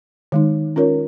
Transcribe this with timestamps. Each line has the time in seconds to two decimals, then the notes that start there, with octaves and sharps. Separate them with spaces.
0.32 D#3 G#3 D#4
0.76 C#4 F4 A#4 C#5